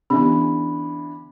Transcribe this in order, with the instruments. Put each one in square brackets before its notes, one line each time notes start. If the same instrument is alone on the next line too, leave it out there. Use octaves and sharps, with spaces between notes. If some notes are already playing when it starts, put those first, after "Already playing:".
[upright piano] D3 E3 [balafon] B3 C#4 G4 [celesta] B5